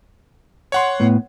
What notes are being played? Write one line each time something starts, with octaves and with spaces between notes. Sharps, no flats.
C#5 F#5 C6
A2 B3